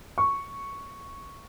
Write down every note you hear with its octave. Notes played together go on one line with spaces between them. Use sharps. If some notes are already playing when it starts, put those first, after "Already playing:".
C#6